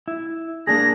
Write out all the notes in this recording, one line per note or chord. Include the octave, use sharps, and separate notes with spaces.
E4
A#3 D4 G#4 A#6